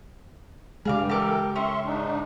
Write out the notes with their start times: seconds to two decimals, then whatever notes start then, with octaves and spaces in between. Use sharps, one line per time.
0.85 G2 C#3 G3 G#3 G#4 F5 D6
1.09 E3 G4 A4 A#4 D6
1.56 C#4 E5 C6 C#6
1.86 G#2 D4 D#4